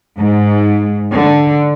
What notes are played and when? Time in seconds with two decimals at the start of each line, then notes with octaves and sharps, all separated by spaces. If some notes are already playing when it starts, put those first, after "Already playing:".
0.19 G#2
1.12 D3